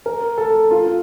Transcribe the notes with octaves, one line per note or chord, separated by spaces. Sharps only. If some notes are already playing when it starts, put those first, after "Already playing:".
A#4
A4
F4